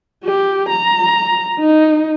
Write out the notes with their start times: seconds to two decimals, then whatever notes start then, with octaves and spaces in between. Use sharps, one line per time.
0.24 G4
0.69 A#5
1.60 D#4